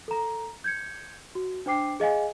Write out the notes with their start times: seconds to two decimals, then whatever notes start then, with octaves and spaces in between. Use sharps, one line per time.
0.08 A4 A#5
0.64 G6 G#6 C#7
1.35 F#4
1.66 D4 C5 G5 D6 C7
2.00 G#4 D#5 F5 G#5